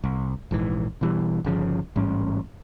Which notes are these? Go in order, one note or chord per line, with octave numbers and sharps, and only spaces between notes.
C2
A#1 G#2 E3
B2 E3 G3
G1 C#3 F3
A1 G#2 G3 C#4